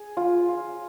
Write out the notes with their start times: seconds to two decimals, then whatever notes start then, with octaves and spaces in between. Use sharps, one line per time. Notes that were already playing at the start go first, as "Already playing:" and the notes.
Already playing: G#4
0.17 F4
0.49 F4